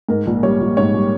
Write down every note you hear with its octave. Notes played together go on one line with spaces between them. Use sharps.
G#2 A#4
A#1
G3 C#5
A#1
G#2 C#5
G3